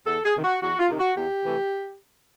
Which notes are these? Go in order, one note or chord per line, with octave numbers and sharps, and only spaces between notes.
E2 A4
G#4
C3 D#3
F#4
E2 F#4
F4
C3 D#3
F#4
E2 G4
C3 E3 A3